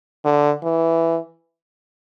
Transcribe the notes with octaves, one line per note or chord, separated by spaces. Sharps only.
D3
E3